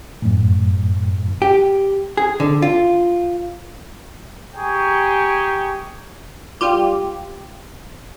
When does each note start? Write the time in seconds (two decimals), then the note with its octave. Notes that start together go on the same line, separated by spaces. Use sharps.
0.22 F#2 A2
1.42 G4
2.17 G#4
2.40 D3
2.62 F4
4.55 G4 G#4 G5 G#5 A#5 C#6
6.61 G3 F4 G4